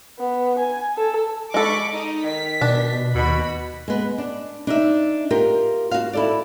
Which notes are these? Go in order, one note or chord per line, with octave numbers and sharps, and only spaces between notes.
B3
G#5
A4
G#3 A4 B5 C#6 D6
D#4 D#5
D#3 B6
B2 D4
D#2 B2 B5
G#3 B3
D4
D4 D#4 E5
F4 G4 A#4
F#4 F5
E4 A4 D5